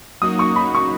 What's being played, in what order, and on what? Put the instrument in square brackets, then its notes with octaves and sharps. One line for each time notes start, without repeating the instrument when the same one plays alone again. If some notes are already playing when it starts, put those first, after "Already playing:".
[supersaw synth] F#3 A#3 D#4 F#4 [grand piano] D#6
[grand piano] C#6
B5
C#6